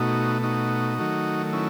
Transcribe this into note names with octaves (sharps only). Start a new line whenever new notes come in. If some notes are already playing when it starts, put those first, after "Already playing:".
Already playing: B2 A3 D#4 F#4
D#4 F#4
D#3 F#3 A3
C#4 E4